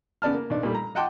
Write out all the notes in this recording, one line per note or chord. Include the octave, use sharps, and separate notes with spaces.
C#3 B3 D5 A5 F6
A#3
B1 D4
A#2 G3 A3
A#5
D#5 F#5 G5 A5 C6 D6